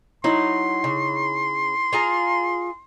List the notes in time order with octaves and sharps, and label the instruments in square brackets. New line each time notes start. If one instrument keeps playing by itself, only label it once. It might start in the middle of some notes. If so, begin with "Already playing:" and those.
[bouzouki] F#3 [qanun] D#4 E4 [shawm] C6
[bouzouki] C#3
F4 G#4 A#5